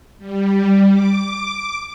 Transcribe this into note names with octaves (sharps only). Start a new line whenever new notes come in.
G3
D6